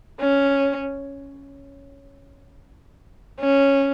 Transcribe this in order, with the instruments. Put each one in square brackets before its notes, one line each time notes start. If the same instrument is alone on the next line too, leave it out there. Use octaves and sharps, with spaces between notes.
[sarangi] C#4
C#4